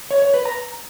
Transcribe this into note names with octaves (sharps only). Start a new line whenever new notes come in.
C#5
C#5
B4
A#5